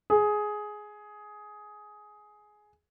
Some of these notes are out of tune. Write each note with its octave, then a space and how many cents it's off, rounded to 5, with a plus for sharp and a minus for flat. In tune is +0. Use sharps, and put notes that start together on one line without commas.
G#4 +10